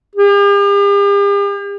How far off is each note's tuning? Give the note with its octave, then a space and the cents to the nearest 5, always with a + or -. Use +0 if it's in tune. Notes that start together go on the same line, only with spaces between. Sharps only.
G4 +45